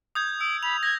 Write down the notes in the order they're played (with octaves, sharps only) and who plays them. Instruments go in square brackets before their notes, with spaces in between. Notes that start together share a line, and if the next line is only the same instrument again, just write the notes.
[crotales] D#6 G6 G#6
[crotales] E6 [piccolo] D7
[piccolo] B5 [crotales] F7
[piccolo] G#6 [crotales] A#6